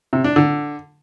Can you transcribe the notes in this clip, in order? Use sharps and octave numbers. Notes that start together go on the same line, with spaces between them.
C3
D4
D3